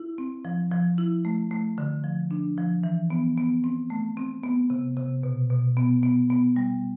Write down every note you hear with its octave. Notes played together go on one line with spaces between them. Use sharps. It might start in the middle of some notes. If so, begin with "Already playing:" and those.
Already playing: E4
C4
F3
F3
E4
A3
A3
D3
F3
D4
F3
E3
B3
B3
C4
A3
C4
B3
C3
C3
B2
B2
B3
B3
B3
G3